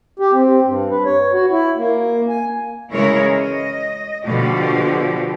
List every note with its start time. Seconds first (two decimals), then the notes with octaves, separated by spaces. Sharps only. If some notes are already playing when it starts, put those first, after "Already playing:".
0.19 G4
0.32 C4
0.66 G2
0.90 B4
1.05 C#5
1.32 F#4
1.51 E4
1.77 A#3
2.29 G#5
2.92 C#3 E3 G#3 E4 A#4 C#5
3.34 D#5
4.26 B2 D3 F3 G4